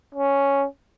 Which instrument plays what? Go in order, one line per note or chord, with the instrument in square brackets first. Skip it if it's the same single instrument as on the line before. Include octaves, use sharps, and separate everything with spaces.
[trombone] C#4